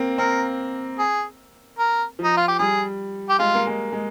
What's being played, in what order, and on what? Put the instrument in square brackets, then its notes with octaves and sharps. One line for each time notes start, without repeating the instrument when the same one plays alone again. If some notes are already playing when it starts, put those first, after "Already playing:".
Already playing: [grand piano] A#3 C4
[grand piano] C4 [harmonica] A#4
[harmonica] G#4
A#4
[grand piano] F3 [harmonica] D#4
[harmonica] F4
G4
[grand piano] G3 [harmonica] G#4
[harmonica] G4
[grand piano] G#3 [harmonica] F4
[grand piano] A#3
G#3
G#3